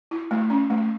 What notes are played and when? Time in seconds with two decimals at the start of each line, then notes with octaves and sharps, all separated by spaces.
0.11 E4
0.31 A3
0.50 C#4
0.70 A3